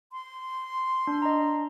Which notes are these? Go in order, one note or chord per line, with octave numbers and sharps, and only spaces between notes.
C6
D4
D#5 A#5